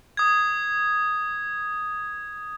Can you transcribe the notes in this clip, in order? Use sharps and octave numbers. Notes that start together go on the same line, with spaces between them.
D#6 G#6